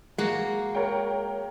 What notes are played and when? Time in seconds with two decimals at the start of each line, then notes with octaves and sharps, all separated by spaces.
0.18 G#3 A#3 F#4
0.75 A#4 C#5 G5